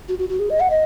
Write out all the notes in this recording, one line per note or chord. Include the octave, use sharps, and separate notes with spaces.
F#4
F#4
F#4
G#4
D#5
F#5
D#5